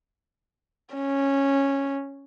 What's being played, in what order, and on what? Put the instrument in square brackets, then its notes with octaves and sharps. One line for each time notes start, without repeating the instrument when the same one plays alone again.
[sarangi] C#4